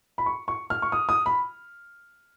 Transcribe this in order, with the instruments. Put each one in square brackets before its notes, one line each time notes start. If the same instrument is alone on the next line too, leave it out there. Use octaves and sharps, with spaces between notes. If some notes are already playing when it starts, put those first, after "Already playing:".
[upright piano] B5
C#6
C#6
F6
C#6
D#6
D#6
B5